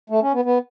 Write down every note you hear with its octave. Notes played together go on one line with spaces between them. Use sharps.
A3
C#4
B3
B3